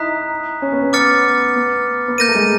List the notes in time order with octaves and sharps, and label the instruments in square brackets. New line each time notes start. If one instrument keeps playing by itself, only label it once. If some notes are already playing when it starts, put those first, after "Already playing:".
Already playing: [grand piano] D#4 E4 [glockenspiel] A#5 D#6 F#6 B6
[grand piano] C#4
B3
B3
[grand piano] B3 [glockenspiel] D6 F6 A6 C#7
[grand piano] B3
B3
[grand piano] A#3 [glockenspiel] G6 A#6 D#7
[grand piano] A3
G#3